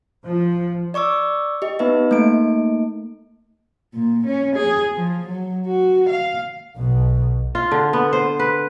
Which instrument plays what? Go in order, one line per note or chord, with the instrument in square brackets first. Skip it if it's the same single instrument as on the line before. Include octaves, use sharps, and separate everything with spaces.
[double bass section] F3
[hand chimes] D5 C#6 D6 E6
G4 D#5
B3 D#4 B4 E5
A3 A#3 D#4 D7
[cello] A#2
C#4
G#4
F3
F#3
F#4
F5
[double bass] B1 B2
[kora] F4
D3
B3
C5
B4